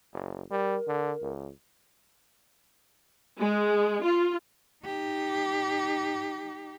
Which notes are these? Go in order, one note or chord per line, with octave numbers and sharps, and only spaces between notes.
F#1
G3 A#4
D3
C#2
G#3
F4
D#4 G4